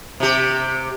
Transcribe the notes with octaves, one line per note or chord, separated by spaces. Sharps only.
C3 G4